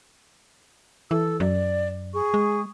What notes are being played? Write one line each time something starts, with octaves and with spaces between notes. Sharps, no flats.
E3 A4 E6
F#2 D5
G#4 C#6
G#3